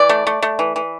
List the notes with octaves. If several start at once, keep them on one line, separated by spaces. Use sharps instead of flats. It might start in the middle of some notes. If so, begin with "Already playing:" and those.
Already playing: E3 D5
A3
A3
A3
E3
E3